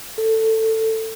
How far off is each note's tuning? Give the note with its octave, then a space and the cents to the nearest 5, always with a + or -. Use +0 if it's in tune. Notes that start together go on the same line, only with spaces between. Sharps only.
A4 +15